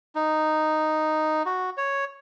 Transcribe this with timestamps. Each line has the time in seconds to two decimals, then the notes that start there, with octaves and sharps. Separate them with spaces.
0.15 D#4
1.46 F#4
1.77 C#5